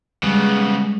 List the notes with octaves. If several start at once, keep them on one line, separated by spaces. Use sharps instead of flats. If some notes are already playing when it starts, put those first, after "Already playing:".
C#3 G3 G#3 B3